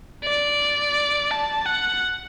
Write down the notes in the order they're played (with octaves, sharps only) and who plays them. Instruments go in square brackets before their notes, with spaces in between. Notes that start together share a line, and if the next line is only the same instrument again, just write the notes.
[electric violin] D5
A5
F#5